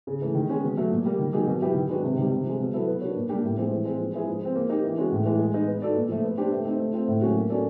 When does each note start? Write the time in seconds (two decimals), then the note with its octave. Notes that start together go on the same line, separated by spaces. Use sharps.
0.07 C#3
0.21 E3 A3
0.35 D#3
0.50 G#3 C#4
0.63 B2
0.77 F#3 A3
0.91 A#2
1.05 G3 A#3
1.19 D#3
1.33 F#3 A#3 D#4 G#4
1.47 B2
1.61 F#3 B3 E4 G4
1.75 D#3
1.89 G#3 B3 D4 F#4
2.04 C3
2.17 D#3 G3
2.32 C3
2.45 F3 G#3
2.60 B2
2.73 F#3 B3 E4 A4
2.87 B3
3.01 D4 F#4 A#4 C#5
3.16 A#2
3.29 G3 A#3 D4 G4
3.44 A2
3.57 F3 G#3 C4
3.71 E3
3.85 G#3 C4
4.00 F3
4.13 G#3 B3 E4 G#4
4.28 F3
4.41 G#3 C4
4.55 A#3
4.69 D#4 G4
4.84 E3
4.98 G#3 C#4 F#4
5.12 A2
5.25 E3 G#3
5.39 G#3
5.53 B3 D#4
5.67 B3
5.82 D#4 F#4 A4 D5
5.96 A#2
6.09 F3 A3
6.24 B3
6.37 D4 G4 C5
6.52 A3
6.65 C4 D#4
6.80 A3
6.93 C4 F4
7.08 A2
7.21 F#3 A#3 C#4 F#4
7.35 A#3
7.50 C#4 F#4 A4 D5